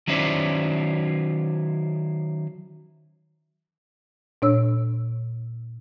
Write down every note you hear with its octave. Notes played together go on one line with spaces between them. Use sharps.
D#3 F#3 C#4 E4 C5 D5
A#2 D4 C#5 E6